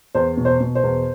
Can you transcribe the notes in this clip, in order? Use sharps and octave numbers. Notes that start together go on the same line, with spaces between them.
E2 C5
B2
C5
B2
C5
E2